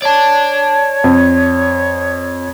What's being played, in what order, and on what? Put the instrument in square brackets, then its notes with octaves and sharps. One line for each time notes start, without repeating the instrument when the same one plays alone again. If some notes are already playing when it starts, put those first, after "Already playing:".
[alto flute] C#5 [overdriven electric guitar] D5 A5
[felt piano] F2